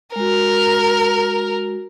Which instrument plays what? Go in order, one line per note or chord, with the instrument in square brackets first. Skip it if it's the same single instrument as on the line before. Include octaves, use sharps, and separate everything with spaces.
[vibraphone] G#3 F#4 [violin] A#4